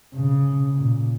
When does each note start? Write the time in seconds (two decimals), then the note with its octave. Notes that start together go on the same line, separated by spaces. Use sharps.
0.14 C#3
0.75 A#2